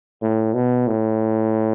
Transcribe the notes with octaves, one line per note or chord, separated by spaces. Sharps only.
A2
B2
A2